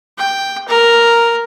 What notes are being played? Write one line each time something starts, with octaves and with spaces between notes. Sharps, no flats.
G5
A#4